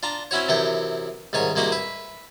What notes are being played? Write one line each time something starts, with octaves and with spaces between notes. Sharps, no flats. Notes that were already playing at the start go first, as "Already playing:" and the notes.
D4 F4 A#5
C4 C#4 E4 F#4 C#5
F#2 C3 E3 F#5 G5
C2 G#2 D#3 C#5 G#5
C2 G#3 A#3 F#4 G4 F#5
B4 E5